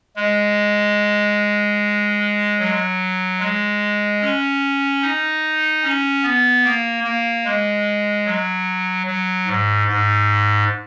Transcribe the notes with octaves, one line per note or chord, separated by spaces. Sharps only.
G#3
F#3
G#3
C#4
D#4
C#4
B3
A#3
A#3
G#3
F#3
F#3
G#2
G#2